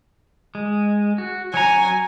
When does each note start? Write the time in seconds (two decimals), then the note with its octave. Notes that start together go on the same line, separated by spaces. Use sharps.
0.55 G#3
1.18 F#4
1.54 F#3 C#5 G#5 A#5